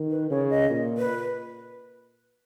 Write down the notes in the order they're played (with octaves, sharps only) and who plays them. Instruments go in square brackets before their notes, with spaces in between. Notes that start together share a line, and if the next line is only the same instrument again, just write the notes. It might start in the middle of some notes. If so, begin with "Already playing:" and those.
Already playing: [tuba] D#3
[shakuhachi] B4
[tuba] C#3 [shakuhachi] C#5
[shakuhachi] D#5
[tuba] A#2
[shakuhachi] B4